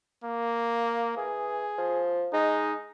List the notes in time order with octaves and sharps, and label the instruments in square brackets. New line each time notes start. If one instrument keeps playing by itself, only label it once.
[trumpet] A#3
[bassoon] E3 [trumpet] G#4
[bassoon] F3
[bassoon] G#3 [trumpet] D#4